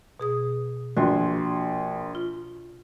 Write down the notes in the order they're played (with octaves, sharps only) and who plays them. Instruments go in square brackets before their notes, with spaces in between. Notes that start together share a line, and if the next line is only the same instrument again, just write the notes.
[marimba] B2 G#4 D#6
[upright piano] A#1 C6 [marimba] F#4
[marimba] F4